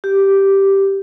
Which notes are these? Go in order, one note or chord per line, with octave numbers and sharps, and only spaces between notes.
G4